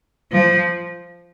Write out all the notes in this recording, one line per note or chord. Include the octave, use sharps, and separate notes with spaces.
F3